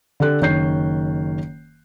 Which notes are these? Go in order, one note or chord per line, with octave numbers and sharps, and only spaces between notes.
D3 G4 A4 F#6
F#1 D#3 C#5 G6 C7